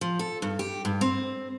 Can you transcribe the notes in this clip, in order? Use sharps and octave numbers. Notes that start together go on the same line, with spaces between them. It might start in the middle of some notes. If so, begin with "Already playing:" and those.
F3
A4
G2
G4
G2
C4